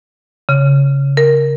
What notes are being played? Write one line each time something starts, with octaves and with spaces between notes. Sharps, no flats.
C#3
A#4